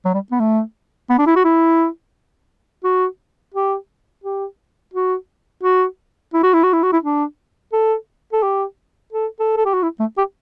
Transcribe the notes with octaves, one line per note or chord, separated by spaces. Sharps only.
F#3
G3
B3
A3
B3
D4
E4
F#4
E4
F#4
G4
G4
F#4
F#4
E4
F#4
E4
F#4
E4
F#4
E4
D4
A4
A4
G4
A4
A4
A4
G4
F#4
E4
A3
G4